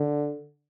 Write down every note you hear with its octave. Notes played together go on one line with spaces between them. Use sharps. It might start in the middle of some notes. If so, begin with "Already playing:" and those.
Already playing: D3